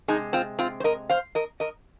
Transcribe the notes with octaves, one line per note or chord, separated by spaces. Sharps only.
C3 G#3 D#4 G#4
C4 F4
C4 F4
C5
A#4 D#5
C5 F5
A#4 D#5
A#4 D#5